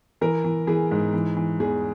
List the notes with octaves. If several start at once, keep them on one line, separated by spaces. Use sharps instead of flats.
E3 A#4
E3
E3 G#4
G#2
E3
E3
E2 G#4